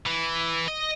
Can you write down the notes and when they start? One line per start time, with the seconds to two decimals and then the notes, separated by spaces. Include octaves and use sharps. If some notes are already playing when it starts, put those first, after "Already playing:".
0.07 E3
0.68 D#5